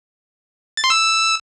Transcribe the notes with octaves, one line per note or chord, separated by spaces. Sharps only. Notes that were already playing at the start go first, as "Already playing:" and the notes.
A6
C6
E6